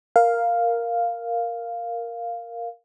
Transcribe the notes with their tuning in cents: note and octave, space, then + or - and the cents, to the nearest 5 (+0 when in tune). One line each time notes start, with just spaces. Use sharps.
A#4 +0 F5 +0